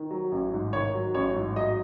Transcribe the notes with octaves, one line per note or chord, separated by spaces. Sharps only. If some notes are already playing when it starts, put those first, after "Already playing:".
Already playing: D#3
F#3
A1
G#2
D#3 C#5
F#3
A1 C#5
G#2
F#3 D#5